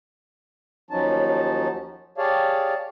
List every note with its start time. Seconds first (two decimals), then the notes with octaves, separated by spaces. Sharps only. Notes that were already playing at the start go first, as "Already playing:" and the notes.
0.90 D#2 F3 F#3 C#4 D#4 A5
2.18 G4 G#4 C#5 D5 F5 A5